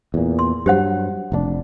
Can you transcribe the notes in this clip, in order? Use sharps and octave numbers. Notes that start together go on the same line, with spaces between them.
E2 A#2
C6
G2 F#3 G4 C5 F#5
F1 C3 D4